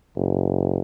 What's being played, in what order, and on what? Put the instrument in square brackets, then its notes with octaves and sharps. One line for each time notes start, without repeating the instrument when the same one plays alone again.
[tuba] F#1